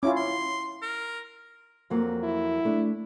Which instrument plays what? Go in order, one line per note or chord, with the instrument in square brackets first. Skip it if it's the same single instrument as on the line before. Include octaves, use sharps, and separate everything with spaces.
[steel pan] C#4 E4 F4 [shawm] D6
[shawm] C6
A#4
[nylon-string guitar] F2 F#3 A#3
[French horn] E4
[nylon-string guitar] A3 D4